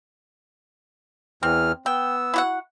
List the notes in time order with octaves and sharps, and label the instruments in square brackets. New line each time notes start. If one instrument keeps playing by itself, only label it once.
[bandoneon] E2 E3 F6 [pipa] C4
[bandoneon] B3 E6 [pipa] G5
[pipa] E4 F#4 F#5